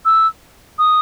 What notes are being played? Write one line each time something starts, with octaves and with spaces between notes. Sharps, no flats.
E6
D#6